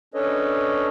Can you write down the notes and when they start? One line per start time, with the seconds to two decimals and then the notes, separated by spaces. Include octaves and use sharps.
0.14 C#4 D4 A4 B4 C#5 D#5